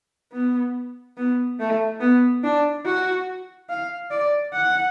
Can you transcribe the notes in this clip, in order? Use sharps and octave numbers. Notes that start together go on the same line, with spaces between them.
B3
B3
A3
B3
D4
F#4
F5
D5
F#5